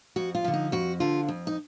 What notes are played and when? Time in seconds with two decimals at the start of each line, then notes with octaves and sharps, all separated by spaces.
0.16 F2 F#4
0.35 F4
0.44 D3 F3
0.54 D#4
0.72 F2 F#4
1.00 D3 F3 F4
1.28 F2
1.47 D#4